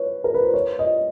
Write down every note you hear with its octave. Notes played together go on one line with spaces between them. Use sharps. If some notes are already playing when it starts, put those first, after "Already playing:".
Already playing: B4 C#5
A#4
B4
C5
C#5
D#5